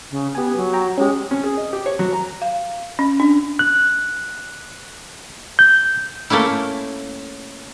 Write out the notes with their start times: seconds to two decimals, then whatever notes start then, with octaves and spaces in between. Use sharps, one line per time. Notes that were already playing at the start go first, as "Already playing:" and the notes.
0.11 C#3
0.35 B3 G4 G#5
0.56 F#3
0.73 G5 A#5
0.98 G#3 C#4 G4
1.31 C#4
1.44 G#4
1.57 D#5
1.73 G4
1.86 C#5
1.99 F#3
2.13 A#5
2.42 F5
2.99 C#4
3.20 D4
3.59 F#6
5.59 G6
6.30 A3 A#3 C#4 E4